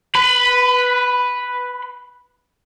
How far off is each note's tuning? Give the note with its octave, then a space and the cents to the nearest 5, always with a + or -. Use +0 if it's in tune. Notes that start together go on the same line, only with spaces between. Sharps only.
B4 +0 B5 +30